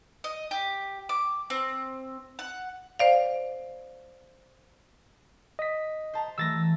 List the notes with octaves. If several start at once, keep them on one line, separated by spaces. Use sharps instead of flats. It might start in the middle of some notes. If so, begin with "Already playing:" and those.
D#5
G4
D6
C4
F#5
C5 D5 F5
D#5 B6
C5 A5 A#5
E3 F#3 A3 E6 A6 A#6